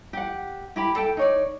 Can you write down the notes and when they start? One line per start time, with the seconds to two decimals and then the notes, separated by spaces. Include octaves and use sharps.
0.13 G4 F#5
0.76 E4 G4 B5
0.96 A4 G5
1.17 D#4 C#5 D5